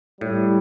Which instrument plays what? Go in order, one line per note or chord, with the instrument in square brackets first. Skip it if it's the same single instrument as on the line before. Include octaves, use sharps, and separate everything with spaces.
[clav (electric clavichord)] A2 [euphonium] G3